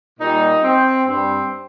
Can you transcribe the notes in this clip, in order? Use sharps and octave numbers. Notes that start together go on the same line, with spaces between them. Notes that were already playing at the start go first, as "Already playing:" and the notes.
A#2 G3 D#4
C4
G2 G3 C4